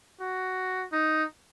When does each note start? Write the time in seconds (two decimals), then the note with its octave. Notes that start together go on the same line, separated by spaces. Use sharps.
0.21 F#4
0.92 D#4